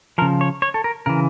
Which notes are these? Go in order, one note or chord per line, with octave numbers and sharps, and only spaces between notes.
C#3 F3 A#4
C#5
C#5
A4
A#4
C#3 E3 A#4